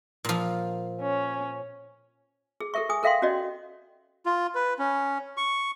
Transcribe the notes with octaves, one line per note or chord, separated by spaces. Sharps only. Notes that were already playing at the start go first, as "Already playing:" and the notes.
A#2 F3
C#4
G#4
G4 A4 A#4 E5 C#6
G#4 G#5 D#6
A4 A#4 E5 F5 G5 C6
C#4 F#4 G4 D5 D#5
F4
B4
C#4
C#6